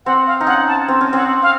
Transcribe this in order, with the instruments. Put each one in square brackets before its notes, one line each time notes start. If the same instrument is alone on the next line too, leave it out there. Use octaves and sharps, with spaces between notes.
[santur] C4 [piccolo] F#5
[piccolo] F5
[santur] D#4
[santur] C#4 [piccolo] F#5
[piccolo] A5
[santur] C4
C#4
[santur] C4 [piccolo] F#5
[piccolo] F5